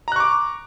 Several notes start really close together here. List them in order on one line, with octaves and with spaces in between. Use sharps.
A#5 F#6 C#6 D6